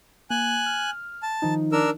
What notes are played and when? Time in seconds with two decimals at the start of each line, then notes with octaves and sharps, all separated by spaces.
0.30 A#3 G#5 F#6
0.66 F6
1.23 A5
1.42 D#3 F3 D#4
1.72 D4 A#4 E6